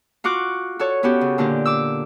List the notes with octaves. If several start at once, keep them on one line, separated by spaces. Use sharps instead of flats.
F4 F#4 C#6 D6 F#6
F#4 A4 C#5
B3 C#4 F#4 G4
C#3
A#2 D3 D4 G4
D6 E6